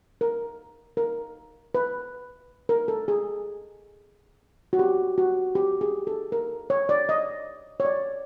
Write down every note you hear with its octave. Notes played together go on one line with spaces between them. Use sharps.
A#4
A#4
B4
A#4
A4
G#4
F#4
G4
F#4
G4
G#4
A4
A#4
C#5
D5
D#5
C#5
D5